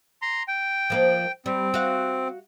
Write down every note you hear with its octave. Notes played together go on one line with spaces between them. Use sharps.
A#5 C6
G5
F3 A#3 D#4
G3 C4
F#4 F5